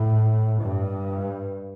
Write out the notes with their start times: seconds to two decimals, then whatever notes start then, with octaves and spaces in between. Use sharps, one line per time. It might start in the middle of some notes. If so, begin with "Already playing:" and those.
Already playing: A2
0.61 G2